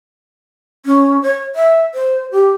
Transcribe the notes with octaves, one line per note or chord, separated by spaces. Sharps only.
C#4
C#5
E5
C5
G4